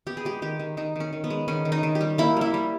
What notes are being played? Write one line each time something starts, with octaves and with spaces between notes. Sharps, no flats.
B3 G4
G#4
G#3 G4
D#3 G4
D#3
D#3 D#4
D#3 C#4
D#3
B3
G#3
D#3 C#4
D#3
D#4
D#3
G4
G3
A#3 E4
G3 E4
G3